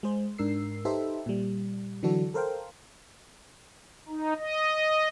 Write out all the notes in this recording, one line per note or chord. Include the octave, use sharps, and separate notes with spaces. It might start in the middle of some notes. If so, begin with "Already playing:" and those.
G#3 G#4 C5
G#2 D4 A#4 E6 C7
D#4 G4 A4 B4 C5 E5
A#2 G3
D3 E3 F#3 D4 F#4 A4
A4 A#4 C5 F5 G5
D#4
D#5